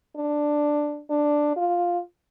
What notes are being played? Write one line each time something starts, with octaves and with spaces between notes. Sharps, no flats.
D4
D4
F4